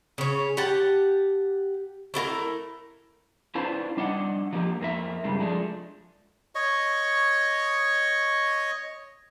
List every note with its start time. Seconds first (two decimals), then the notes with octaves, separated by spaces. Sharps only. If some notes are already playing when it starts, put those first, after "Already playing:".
0.18 C#3 C#4
0.57 G4 F#5 A5
2.14 A3 E4 F4 A#4
3.55 C#4 D4 E4 F4 B4 C5
3.97 G3 D4 D#5 F5 F#5
4.53 F3 A#3 G4
4.81 F2 A#3 E5
5.24 G2 C#3 G3 G#3
5.39 F3 G#3 A3 D4
6.55 C#5 D#5 C#6